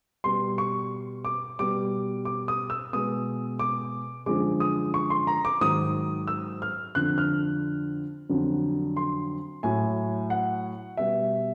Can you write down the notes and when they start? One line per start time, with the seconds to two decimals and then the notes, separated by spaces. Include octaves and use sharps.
0.24 B2 G3 C6
0.58 C#6
1.25 D6
1.59 B2 G3 D6
2.25 D6
2.48 D#6
2.70 E6
2.93 B2 G#3 D#6
3.59 D6
4.26 F#2 D3 F3 G#3 D6
4.60 D#6
4.94 C#6
5.10 C6
5.27 A#5
5.45 D6
5.61 G#2 D#3 F#3 D#6
6.28 E6
6.62 F6
6.95 F2 D3 F3 F#6
7.18 F6
8.29 F2 D3 F#3
8.97 C6
9.63 A2 F#3 G#5
10.30 F#5
10.97 B2 G3 E5